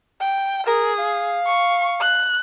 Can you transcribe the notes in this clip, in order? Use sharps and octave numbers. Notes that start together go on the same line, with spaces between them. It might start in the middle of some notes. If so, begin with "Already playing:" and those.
G5
G#4 A#4
F5
C#6
F#6